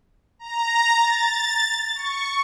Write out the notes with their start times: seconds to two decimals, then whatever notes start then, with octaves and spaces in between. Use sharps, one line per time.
0.39 A#5
0.94 A6
1.95 C#6